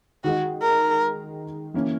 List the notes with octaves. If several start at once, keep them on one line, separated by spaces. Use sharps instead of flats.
D#3 G#3 D#4 F#4
A#4
E3 A#3 C#4